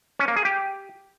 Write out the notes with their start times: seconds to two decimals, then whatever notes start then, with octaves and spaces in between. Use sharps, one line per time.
0.19 C#4
0.28 A#3
0.36 G#4
0.45 G4